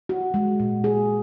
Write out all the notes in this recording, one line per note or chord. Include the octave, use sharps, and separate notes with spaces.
F#4
G#3
A#2
G#4